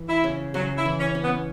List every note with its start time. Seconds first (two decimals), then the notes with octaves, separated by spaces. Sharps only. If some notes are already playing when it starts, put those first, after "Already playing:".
Already playing: E3
0.09 E4
0.24 C#3
0.54 C#3 F#3
0.78 E4
0.85 E3
1.00 C#4
1.15 C#4
1.23 B3